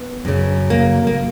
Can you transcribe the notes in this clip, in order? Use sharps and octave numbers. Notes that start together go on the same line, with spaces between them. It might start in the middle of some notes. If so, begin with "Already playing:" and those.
Already playing: B3
F#2 C#3
A#3
A#3